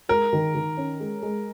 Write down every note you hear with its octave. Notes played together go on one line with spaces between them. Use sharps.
G#3 A#4
D#3
D#3
C#4
G#3
G#3